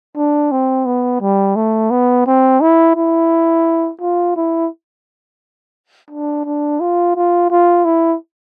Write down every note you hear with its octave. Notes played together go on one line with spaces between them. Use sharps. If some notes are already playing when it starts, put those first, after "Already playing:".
D4
C4
B3
G3
A3
B3
C4
E4
E4
F4
E4
D4
D4
F4
F4
F4
E4